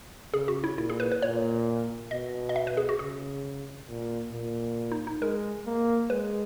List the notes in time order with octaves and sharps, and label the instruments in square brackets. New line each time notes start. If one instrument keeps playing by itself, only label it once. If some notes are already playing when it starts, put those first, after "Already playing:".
[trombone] C#3 [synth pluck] G#4
[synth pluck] F#4
E4
[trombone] A#2 [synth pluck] E4
[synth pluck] G#4
B4
B4
[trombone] A#2 [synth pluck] C#5
[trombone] B2 [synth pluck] D#5
[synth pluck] D#5
E5
B4
G#4
F#4
[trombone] C#3 [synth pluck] G#4
[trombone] A#2
A#2
[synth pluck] D#4
D#4
[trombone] G#3 [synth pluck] A#4
[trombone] A#3
[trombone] G#3 [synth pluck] B4